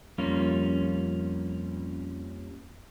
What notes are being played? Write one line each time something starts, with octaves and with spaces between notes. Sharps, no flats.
F2 G3 A#3 C#4 F4